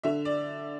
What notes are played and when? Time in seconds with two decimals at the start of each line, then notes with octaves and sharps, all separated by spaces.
0.03 D3 E5
0.25 D5